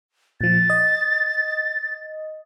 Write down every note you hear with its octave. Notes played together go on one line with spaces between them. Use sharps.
A#2 F3 A6
D#5